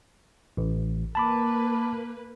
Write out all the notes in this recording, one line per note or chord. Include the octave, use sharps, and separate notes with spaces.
A1
A#3 B4 A5 B5 D6